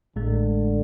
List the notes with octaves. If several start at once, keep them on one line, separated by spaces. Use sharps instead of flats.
A1 A2 D3 G#3